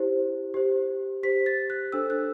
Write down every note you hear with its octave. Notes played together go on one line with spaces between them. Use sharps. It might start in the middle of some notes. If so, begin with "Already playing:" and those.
Already playing: E4 G4 C5
G4 C5
G4 C5 B6
A6
F#6
D4 A4 C5 E6
F#6